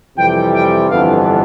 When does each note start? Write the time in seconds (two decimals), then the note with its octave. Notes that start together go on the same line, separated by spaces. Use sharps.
0.17 F2 C3 E3 G3 G5
0.53 G5
0.89 G1 F2 E3 B3 D4 F5